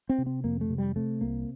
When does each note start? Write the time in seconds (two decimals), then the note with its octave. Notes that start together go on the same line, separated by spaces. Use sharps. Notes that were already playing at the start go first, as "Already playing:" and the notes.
0.09 C4
0.18 C3
0.26 C4
0.44 F2 A#3
0.61 A3
0.70 C3
0.78 G3
0.96 C3 A3
1.21 C2 A#3